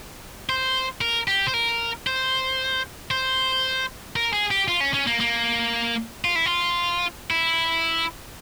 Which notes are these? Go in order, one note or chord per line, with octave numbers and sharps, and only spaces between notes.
C5
A#4
G4
C5
A#4
C5
C5
A#4
G#4
G4
F4
C#4
C#4
A#3
A#3
F4
E4
F4
E4